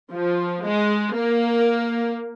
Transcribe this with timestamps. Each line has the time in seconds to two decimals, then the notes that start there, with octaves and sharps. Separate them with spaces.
0.11 F3
0.63 G#3
1.15 A#3